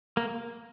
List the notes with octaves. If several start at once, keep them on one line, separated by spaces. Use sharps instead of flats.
A#3